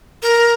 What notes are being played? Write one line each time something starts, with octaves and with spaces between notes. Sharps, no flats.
A#4